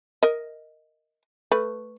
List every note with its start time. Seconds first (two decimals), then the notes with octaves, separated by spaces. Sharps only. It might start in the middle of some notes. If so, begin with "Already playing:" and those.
0.23 A#4 D#5
1.52 A3 B4